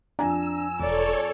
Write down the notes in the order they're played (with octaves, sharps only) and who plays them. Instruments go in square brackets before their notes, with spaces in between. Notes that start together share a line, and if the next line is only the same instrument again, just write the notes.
[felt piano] F2 G#5 A#5 [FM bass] D4 [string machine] E6
[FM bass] E1 [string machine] A4 C#5 [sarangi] D5